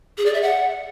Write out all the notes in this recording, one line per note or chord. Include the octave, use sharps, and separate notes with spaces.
G#4
D5
E5
F#5